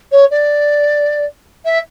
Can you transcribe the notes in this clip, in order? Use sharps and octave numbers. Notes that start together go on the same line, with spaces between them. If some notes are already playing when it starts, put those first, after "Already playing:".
C#5
D5
E5